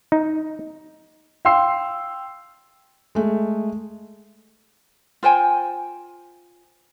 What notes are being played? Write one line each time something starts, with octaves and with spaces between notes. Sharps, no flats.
D#4
F5 G5 C6 E6 C7
G#3 A3
F4 C5 G5 G#5